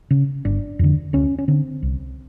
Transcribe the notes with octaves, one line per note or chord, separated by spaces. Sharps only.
C#3
G1 D4
F2 D3
D2 C#4
C#4
D3 C4
C2